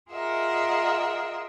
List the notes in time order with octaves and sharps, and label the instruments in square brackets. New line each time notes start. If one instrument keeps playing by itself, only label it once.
[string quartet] F4 G#4 A#4 D#5 E5 F#5